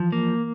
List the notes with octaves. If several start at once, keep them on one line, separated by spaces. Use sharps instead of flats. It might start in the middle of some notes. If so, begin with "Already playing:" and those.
Already playing: E3 F3
A#3